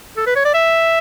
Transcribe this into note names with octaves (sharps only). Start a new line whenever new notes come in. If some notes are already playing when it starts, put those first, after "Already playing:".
A4
B4
C#5
D5
E5